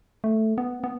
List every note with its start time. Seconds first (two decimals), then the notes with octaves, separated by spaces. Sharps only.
0.24 A3
0.58 B3
0.84 B3